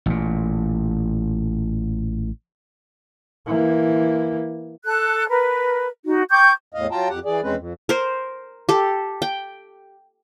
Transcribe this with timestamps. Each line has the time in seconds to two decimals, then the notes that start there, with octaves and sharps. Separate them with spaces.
0.06 A1 A#2
3.46 E3 A#3
4.85 A4 F#6
5.29 A#4 B4
6.05 D#4 F#4
6.31 G5 C#6 D6 G6
6.74 E2 A2 D#5 F5
6.91 F#3 F4 G5 A5 A#5
7.09 F2 G4 F#5
7.25 E3 G#4 D5
7.43 E2 G#3 C4 C#4 B4
7.57 F2
7.89 A#4 C5
8.69 G4 A4
9.22 G5